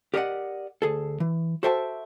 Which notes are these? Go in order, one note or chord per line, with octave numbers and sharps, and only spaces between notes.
G4 A#4 D5 D#5 F5 F#5
D2 G#4 A4
E3
F#4 A4 C5 E5 G5 A5